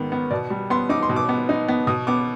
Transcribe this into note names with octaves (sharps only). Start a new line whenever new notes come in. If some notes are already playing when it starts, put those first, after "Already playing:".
Already playing: G#2 D#3 B3
B3
B2 D5
G3
B3 C6
D#4 D6
C6
B2
D6
B3
D#4
B3
B2 D#6
B3 D6